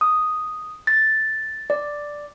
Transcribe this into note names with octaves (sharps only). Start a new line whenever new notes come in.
D#6
A6
D5